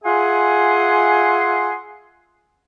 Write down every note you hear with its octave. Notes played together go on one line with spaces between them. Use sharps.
F4 G#4 E5 F#5 G#5 C6